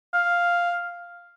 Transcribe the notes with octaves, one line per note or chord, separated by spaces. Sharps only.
F5